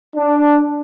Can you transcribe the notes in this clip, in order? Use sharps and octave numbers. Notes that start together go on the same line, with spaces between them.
D4